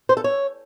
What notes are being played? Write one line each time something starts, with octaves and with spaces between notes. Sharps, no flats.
C5
A4
C#5